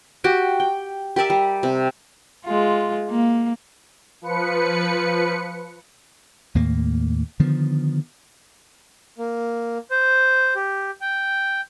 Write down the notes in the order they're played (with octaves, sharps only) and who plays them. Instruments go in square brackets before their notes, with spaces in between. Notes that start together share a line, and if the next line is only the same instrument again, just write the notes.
[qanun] F#4 G4 G5
G5
G4 A#4 D5 E5
G3
C3
[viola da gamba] G#3 F4
A#3
[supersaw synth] F3 B4 C#7
[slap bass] D#2 A2 A#3
D3 D#3 F3 B3
[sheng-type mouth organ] A#3
C5
G4
G5